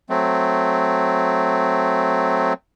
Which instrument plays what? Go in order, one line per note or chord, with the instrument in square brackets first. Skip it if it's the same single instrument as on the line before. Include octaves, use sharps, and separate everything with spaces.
[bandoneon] F#3 A3 C4